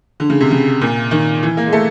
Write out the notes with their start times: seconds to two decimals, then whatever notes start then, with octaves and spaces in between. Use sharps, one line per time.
0.20 D3
0.30 C#3
0.40 C3
0.51 C#3
0.81 A#2
1.11 D#3
1.43 E3
1.57 A#3
1.66 G#3
1.73 A3